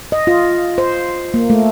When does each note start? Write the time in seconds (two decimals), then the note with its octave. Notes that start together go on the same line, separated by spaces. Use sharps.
0.12 D#5
0.27 F4
0.78 C5
1.34 A#3
1.50 A3